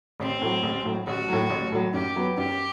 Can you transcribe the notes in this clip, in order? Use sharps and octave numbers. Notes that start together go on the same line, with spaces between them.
A1 C4
A2 F#3
A1
A2 F#3
A1 F#4
A2 F#3
A1
A2 F#3
F#2 G4
F#3 B3
F#2 G4